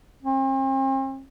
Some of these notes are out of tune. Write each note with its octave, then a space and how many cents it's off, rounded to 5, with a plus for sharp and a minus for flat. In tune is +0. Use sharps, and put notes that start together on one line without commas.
C4 +45